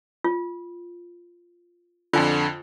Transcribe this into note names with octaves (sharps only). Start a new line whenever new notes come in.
F4
F2 D3 F4 G#5